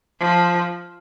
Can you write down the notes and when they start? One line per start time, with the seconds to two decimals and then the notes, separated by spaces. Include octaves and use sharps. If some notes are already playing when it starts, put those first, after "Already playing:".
0.20 F3